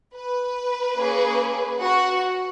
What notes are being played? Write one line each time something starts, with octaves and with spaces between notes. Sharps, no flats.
B4
A#3 C#4 G#4
F#4 F#5